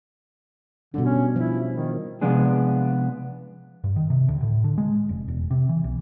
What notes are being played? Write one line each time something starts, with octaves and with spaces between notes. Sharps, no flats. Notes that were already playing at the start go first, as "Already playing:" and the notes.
B2 D3 G3 D4
C#4
F3 E4
D#3
C3 F3 G#3 B3 D4 G#4
G2
D#3
C3
D2
A2
D3
G#3
F1
E1
C3
E3
B1